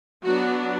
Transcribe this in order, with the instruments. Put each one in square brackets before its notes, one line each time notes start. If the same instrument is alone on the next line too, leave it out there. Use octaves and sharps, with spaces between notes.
[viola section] F#3 B3 D4 F#4